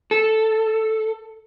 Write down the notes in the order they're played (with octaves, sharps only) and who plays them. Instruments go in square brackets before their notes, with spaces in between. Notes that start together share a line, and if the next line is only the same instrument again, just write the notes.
[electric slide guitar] A4